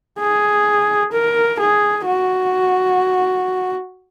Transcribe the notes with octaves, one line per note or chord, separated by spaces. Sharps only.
G#4
A#4
G#4
F#4